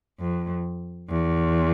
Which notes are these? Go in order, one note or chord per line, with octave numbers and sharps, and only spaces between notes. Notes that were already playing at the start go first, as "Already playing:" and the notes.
F2
E2